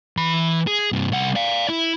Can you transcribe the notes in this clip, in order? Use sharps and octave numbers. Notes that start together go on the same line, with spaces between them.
E3 B5
G#4
G2 C3
C2 F#5
D5 F5
E4